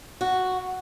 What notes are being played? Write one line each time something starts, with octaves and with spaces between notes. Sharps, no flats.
F#4